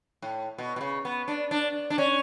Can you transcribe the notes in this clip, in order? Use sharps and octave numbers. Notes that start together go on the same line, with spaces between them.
A2
B2
B2
C#3
B3
D4
D4
D4
C#4